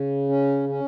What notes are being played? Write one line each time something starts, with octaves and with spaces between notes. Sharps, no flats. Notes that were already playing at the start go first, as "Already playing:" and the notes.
Already playing: C#3
C#4
C#4